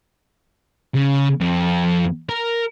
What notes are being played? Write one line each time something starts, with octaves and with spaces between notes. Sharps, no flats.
C#3
F2
A#4